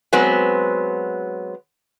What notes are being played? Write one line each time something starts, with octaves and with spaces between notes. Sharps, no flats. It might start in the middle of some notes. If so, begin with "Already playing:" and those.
F#3 G#3 B3 C4